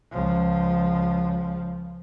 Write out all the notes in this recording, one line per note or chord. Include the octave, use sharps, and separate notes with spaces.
C#2 F3